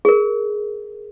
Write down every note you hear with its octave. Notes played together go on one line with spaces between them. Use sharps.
G#4 A#4